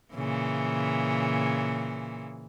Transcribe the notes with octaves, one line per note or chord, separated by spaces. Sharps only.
A#2 C#3 E3